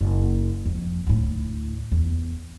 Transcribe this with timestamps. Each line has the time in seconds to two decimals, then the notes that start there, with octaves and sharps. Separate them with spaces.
0.01 F#1
0.66 F2
1.07 D2 A2
1.92 E2